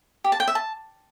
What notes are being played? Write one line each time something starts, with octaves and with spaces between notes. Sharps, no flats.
G4
A5
G5
E5
A5